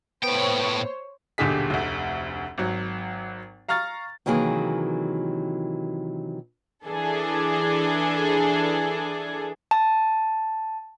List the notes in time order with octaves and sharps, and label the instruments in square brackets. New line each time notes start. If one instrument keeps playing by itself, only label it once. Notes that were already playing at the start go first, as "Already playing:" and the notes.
[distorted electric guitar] A2 G5 [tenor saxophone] B3 [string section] C5 C#5
[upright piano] D#1 B1 D3 G4 G#4 B6
F1 D2
G#1 F#3
F5 A#5 C#6 F6 A6
[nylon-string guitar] C3 D#3 E3 F#3 A#3 G#4
[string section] E3 D4 G#4 A4
[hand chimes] A5